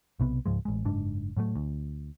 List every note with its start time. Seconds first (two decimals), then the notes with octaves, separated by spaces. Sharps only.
0.20 B1 C3 B3
0.46 C#2 G#2 F3 G#3
0.65 A1 G#3
0.85 F#1 G#2 D4
1.37 A2 F#3 G3 A3
1.55 D2